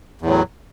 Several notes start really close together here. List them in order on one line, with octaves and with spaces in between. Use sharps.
E2 A2 F#3